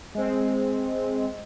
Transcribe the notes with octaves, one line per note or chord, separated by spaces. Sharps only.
G#3 C4